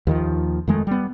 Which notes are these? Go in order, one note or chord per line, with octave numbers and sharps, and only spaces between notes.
D#2 D#3 F3
F2 D#3 G#3 A3
G3 B3